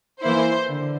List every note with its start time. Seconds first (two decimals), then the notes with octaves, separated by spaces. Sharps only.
0.22 E3 A#3 E4 C5
0.69 D3